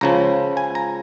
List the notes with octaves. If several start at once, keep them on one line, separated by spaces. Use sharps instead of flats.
C#2 C#3 F3 A#5
G#5
A#5